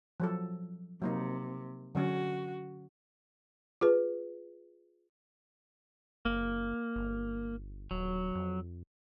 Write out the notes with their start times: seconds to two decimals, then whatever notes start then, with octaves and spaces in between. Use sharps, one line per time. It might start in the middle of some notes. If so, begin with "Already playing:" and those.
0.20 F3 F#3 A4
1.02 C3 F#3 A#3 D#4
1.95 D3 F#3 C#4 F#4
3.81 F4 G#4 B4
6.25 F#1 A#3
6.96 G1
7.91 D#1 F#3
8.35 F2